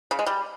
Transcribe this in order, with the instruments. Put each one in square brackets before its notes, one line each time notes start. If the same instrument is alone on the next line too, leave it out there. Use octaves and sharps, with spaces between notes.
[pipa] C#3
G#3
G3